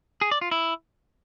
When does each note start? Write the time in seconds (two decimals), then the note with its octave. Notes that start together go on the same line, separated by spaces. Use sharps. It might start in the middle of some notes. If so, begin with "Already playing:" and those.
0.21 G#4
0.31 D5
0.41 F4
0.51 E4